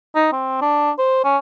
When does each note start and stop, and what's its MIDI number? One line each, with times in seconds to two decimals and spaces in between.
0.15 0.28 63
0.32 0.58 60
0.62 0.91 62
0.98 1.22 72
1.24 1.37 61